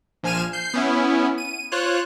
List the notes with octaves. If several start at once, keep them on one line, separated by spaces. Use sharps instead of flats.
A#1 F3 G#5 F6 D#7 E7
G6 C7
B3 C#4 E4
D#7
F4 C5 C#5 F#6